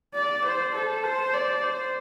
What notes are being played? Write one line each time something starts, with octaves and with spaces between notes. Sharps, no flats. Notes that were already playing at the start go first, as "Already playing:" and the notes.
D5
C5
A4
C5
D5
C5